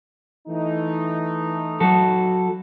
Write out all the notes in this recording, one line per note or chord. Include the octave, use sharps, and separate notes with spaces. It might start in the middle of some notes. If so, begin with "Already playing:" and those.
E3 A3 D#4
F#3 F#4 A4